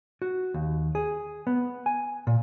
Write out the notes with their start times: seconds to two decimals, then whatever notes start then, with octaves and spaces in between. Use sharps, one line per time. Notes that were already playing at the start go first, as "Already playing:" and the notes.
0.22 F#4
0.54 D#2
0.95 G#4
1.47 B3
1.86 G#5
2.27 A#2